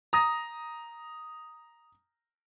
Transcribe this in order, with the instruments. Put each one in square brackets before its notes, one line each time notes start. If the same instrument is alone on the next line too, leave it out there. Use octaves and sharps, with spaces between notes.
[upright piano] A#5 D#6 A#6